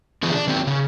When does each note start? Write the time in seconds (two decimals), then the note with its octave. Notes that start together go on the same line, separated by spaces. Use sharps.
0.23 D3 E3 F3 G#4
0.35 D4
0.47 D#3 F#3 C4
0.67 C#3